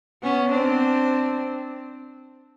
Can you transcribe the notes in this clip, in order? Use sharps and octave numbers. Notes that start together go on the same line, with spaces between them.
B3 C#4
C4 D4